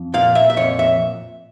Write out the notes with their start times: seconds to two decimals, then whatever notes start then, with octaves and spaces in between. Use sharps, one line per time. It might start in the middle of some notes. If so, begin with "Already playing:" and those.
Already playing: F2
0.14 A#2 F5
0.35 E5
0.50 E5
0.57 F2 C#5
0.79 E5